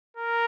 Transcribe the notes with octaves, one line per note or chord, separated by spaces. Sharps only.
A#4